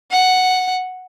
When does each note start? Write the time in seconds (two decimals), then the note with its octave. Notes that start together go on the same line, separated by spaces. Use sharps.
0.11 F#5